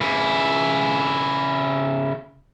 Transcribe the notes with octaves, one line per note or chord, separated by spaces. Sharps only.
C#3 E4